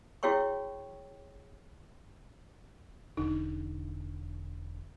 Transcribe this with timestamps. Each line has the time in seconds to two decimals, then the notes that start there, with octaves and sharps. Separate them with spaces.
0.23 E4 F#4 G#4 C#5 G5 C#6
3.17 E1 D3 D#4